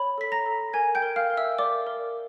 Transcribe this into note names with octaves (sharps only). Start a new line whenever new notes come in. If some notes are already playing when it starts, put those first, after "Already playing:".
Already playing: C#5 B5
A4 B6
A#5 A#6
A4
A#4 G#5 G#6
G5 G6
A#4
F5 F6
A#4
E5 E6
A#4 D5 D6
A#4